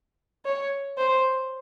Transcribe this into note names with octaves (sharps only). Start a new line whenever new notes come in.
C#5
C5